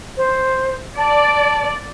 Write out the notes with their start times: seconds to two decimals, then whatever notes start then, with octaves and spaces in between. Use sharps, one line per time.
0.17 C5
0.98 D5 A5